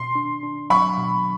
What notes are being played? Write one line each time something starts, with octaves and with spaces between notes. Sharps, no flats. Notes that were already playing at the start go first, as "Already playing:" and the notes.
Already playing: B2 C6
D4
D4
F#3 B5 C#6
B2